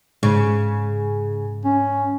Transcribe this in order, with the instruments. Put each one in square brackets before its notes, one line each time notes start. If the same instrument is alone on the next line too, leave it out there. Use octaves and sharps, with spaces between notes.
[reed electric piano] G#2 [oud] C#3
[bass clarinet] C#4